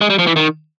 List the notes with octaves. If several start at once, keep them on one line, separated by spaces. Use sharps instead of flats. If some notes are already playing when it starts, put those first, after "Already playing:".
G#3
G3
F3
E3
D#3